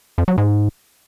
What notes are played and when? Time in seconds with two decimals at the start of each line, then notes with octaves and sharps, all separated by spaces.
0.18 F2
0.28 F#3
0.38 G#2